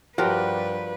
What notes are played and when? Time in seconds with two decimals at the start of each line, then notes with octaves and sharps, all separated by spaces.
0.18 G2 F3 G3 F#4 G4 A#4 B4